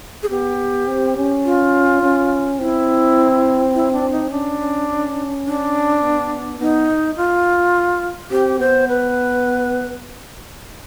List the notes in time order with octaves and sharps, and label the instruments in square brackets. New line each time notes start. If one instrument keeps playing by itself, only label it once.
[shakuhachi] G#4
[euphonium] B3 [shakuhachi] G4
[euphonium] C4
C#4
[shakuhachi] F4
[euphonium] C#4
[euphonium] C4 [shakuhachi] E4
[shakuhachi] E4
D4
D#4
[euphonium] C#4 [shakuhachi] D4
[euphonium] C#4
C#4
[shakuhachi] D4
[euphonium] B3
[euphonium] B3 [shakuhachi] D#4
[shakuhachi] F4
[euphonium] C4 [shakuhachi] G4
[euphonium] B3 [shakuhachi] C5
[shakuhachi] B4